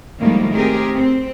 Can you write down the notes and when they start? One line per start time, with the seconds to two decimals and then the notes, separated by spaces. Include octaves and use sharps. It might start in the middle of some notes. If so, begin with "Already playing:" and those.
0.20 A2 D#3 F3 G3 G#3 A#3
0.55 C4 G4 G#4 A#4
0.94 C4